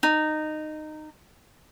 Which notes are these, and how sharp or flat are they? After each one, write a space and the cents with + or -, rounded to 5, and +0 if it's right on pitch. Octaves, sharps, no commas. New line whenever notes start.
D#4 -15